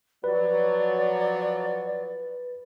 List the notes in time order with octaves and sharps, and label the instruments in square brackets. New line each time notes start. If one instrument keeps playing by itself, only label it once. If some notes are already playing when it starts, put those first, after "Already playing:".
[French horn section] F3 F#3 [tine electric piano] B4 [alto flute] D5